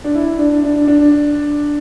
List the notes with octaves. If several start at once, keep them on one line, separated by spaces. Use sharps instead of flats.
D4
E4
D4
D4
D4